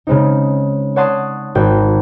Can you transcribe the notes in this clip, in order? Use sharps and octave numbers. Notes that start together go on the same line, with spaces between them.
C#3 G#3 C4 D#4
C#5 D5 F#5 A5 C6 D#6
G#1 F#4 G5 G#6